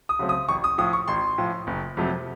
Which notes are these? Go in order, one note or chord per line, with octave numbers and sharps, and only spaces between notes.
D#6
C#3 F#3 A3 C4
D#6
A1 C#6
D#6
A2 F3 D#6
C#6
A1 C6
A2 F3
F#1
F2 C3 F#3 A3